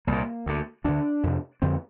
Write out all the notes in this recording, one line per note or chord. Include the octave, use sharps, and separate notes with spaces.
C2 A#2 A#3
D2 D3
D2 D3 D4
F2 C3
F2 D3 C4